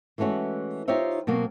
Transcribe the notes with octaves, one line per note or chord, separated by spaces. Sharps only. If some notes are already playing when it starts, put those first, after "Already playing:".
E3 G#3 A3 C#4 F#4
D#4 F4 G4 C5 C#5 E5
B2 F#3 A#3 C4